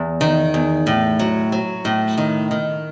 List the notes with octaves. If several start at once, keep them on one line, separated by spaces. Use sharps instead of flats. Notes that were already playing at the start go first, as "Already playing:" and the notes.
Already playing: E2
D#3
E2
A2
F#3
F#3
A2
D#3
D#3